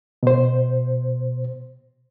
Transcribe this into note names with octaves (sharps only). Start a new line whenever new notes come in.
B2 C5